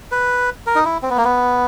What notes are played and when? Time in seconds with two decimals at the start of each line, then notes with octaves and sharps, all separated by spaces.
0.12 B4
0.67 A#4
0.75 D#4
0.85 E4
1.03 C4
1.10 B3
1.17 A#3
1.25 B3